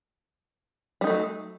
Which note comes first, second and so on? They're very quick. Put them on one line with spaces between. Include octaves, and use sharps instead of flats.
G3 D#4 A3 F#3